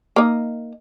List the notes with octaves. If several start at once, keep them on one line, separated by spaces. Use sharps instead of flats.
A#3 D#4